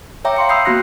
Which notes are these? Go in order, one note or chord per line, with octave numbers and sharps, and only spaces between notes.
C#5 E5 G5 A#5 D6
F5 C6 C#7
B5 D#6 E6 G6 C7
A#3 B3 F#4 B5 F#6 A#6